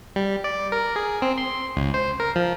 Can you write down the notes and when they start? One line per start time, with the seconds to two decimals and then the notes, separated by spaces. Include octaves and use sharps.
0.16 G3
0.44 D5
0.72 A#4
0.96 G#4
1.22 C4
1.38 C6
1.77 C#2
1.94 C5
2.20 A#4
2.36 F3